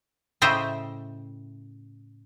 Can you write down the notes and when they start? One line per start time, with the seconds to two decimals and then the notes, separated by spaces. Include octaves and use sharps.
0.42 A2 C#3 C5 D#5 E5 G5